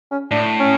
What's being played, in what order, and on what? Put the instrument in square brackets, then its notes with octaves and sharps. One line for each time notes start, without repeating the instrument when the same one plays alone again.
[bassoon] C#4
[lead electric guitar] A2 [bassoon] D4
[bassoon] C#4